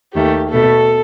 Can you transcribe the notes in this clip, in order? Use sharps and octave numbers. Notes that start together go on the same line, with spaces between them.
D#2 D#3 A3 G4
B2 A3 A4